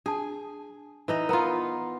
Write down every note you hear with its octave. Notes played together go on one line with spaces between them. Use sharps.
D4 G#4 A5
E3 D#4 D#5
B3 F4 A#4 A#5